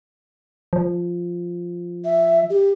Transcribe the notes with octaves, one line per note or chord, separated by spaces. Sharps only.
F3
E5
G4